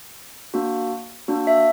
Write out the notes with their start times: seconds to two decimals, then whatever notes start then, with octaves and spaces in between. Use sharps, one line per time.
0.54 A#3 D4 F#4
1.28 A#3 D4 F#4
1.47 E5